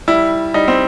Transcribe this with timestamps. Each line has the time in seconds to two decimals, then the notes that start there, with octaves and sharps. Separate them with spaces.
0.08 G3 E4
0.54 G3 D#4
0.68 C4